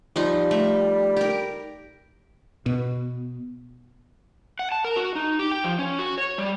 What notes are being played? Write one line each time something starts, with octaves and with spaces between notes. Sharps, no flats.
F3 G3 D#4 F4
A3
G4 A#4
B2
F#5
A5
A#4
F#4
D#4
G4
G5
F3
C#4
F#4
C#5
G3